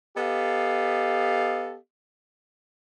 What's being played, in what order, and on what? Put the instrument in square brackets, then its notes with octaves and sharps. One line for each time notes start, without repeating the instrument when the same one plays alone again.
[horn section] B3 G4 A4 D#5 F5